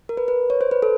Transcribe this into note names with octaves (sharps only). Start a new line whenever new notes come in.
A#4
B4
B4
C#5
C5
B4
A4